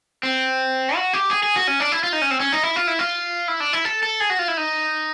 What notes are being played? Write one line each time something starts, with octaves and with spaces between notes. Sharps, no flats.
C4
F#4
G4
G#4
G#4
F#4
C#4
D4
E4
F4
D#4
C#4
C4
C#4
D#4
E4
F4
E4
F4
E4
D4
E4
A4
A4
G#4
F#4
F4
E4
D#4